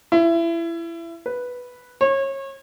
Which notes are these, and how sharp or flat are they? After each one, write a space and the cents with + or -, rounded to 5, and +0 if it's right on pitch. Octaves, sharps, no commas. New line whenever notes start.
E4 +25
B4 -5
C#5 -30